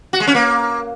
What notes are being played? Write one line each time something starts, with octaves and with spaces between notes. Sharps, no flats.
F#4
G#3
C#4
A#3